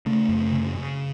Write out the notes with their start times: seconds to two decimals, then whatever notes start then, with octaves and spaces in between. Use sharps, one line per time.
0.06 C#3 A3
0.29 F#2
0.53 C#3
0.76 C#3